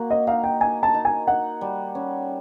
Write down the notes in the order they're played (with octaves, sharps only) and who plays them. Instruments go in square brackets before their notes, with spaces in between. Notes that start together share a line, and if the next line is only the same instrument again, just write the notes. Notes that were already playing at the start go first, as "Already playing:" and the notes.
Already playing: [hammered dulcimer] A#3 F#4
[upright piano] D#5
[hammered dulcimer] D#4 [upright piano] F5
[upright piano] G5
[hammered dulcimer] D#4 [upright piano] G#5
[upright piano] A5
[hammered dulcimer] D#4
[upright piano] G#5
[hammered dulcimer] D#4 [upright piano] F#5
[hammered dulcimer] G3
C#4